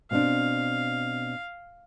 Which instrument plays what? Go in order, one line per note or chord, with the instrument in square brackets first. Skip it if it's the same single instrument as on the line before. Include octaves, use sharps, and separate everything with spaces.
[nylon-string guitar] B2 C4 D4 [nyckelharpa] F5